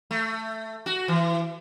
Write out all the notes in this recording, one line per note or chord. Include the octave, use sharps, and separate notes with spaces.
A3
F#4
E3